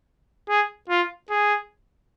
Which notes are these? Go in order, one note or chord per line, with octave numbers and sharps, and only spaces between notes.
G#4
F4
G#4